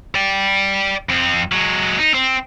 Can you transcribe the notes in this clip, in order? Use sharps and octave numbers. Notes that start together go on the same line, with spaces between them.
D5 G5
F2 C4
F#3 G#3
D#4
C4